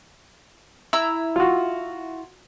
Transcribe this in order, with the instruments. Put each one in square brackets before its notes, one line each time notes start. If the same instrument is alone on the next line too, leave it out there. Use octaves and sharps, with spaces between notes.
[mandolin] E4 A#5 E6
[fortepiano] F4 F#4